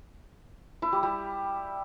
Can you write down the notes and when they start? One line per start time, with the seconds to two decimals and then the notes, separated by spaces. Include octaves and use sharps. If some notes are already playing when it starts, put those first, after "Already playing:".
0.82 E4
0.93 G3
1.03 G3